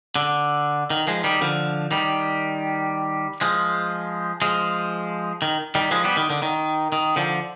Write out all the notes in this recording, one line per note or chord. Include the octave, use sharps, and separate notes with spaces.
D3
D#3
F3 G#3
D#3 G3
D3 F3
D#3 G3
F3 G#3
F3 G#3
D#3
D#3 G3
F3 G#3
G3 B3
D#3
D3
D#3
D#3
D3 F3